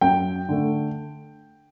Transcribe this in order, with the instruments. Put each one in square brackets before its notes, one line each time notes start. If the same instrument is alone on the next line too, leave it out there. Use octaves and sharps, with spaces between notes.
[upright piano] F#2 G5
D3 A3